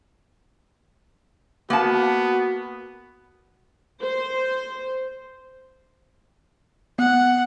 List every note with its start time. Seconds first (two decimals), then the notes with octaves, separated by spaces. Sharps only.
1.70 A#3 B3 F#4 A5
4.02 C5
6.99 B3 F#5